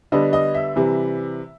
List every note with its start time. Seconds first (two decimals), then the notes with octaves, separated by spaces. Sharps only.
0.12 D3 G3 B3 D4 D#5
0.33 D#5
0.54 E5
0.76 C3 E3 G3